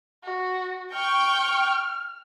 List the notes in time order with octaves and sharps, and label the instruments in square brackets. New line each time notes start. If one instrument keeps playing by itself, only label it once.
[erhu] F#4
[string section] G5 C#6 [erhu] F6